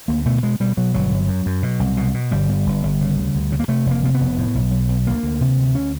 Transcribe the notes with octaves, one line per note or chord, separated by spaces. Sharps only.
D2 A#3
B2 A3
B2 G#3
B2 G3
B2 F#3
G1 F#3
G1
F#2
F#2
B2
C2
B2
B2
G1 G3
G1
G1
G1
C#3
D2
D2
C#3
A#3
C3 A3
F1 A#3
C3 A#3
B3
F1
A2
B1
B1
B1
D2 A#3
D2
C3
D2
C#4